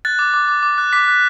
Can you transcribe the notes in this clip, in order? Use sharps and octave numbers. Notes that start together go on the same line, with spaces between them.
F#6 A6
D6
D6
D6
D6
F#6
D6 B6
F#6